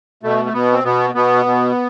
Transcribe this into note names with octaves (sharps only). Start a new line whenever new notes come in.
B2 A3
A3
B2 B3
C4
B2 B3
B2 B3
B2